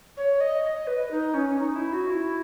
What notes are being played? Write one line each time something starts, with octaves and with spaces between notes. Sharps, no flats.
C#5
D#5
D#5
B4
D#4
C#4
D#4
E4
F#4
E4